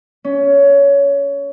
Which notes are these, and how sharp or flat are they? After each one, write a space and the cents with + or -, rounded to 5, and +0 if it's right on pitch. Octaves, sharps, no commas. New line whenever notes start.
C#4 +20